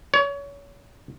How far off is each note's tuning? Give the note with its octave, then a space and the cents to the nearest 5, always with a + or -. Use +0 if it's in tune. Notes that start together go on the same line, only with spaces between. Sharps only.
C#5 +30